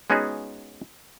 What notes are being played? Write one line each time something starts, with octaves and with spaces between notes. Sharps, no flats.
G#3 B3 C#4 D#4 F#4 G#4